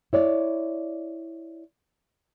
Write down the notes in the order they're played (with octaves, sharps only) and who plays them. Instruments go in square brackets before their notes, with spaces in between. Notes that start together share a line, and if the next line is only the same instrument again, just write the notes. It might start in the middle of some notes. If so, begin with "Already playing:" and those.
[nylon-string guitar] E4 C#5 D5